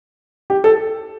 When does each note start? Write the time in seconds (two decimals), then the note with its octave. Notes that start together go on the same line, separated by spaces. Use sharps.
0.50 G4
0.64 A4